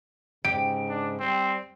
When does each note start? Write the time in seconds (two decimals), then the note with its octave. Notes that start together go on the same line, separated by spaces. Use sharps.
0.45 G#2 C#3 G4 D7
0.89 D4
1.20 G3 C4